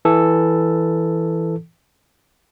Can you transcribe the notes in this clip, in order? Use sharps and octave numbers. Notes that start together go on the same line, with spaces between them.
E3 A4